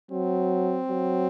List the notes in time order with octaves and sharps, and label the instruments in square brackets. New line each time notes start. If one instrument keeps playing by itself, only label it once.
[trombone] F#3 [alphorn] C4
[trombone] F#3